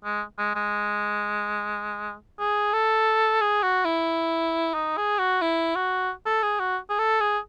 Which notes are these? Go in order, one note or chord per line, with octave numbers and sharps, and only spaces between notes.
G#3
G#3
G#3
G#4
A4
G#4
F#4
E4
D#4
G#4
F#4
E4
F#4
A4
G#4
F#4
G#4
A4
G#4